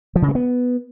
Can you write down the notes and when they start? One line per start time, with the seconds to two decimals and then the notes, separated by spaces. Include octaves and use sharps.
0.16 F3
0.22 C#3
0.29 G#3
0.35 B3